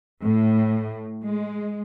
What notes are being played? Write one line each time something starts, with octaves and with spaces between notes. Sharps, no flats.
A2
G#3